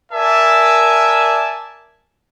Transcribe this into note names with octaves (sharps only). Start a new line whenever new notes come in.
A#4 D5 E5 G#5 A5